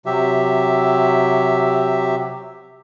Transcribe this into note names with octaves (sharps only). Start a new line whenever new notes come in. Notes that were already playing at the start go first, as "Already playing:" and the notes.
C3 F#3 G4 E5